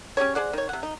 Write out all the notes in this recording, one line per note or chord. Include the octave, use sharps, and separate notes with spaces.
C#4 G4 G#4 C#5
G#4 C5 D5 F#5
D#3 C#5
C3 F#5
D#4